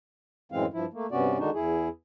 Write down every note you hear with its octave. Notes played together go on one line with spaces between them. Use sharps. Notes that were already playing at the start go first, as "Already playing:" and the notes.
F#2 A2 E3 G#3 C4 F5
G2 F3 E4
A3 A#3
G2 C3 B3 C#4 F#4 D5
D3 D#3 G#3 D4 D#4 F#4
E2 E4 G#4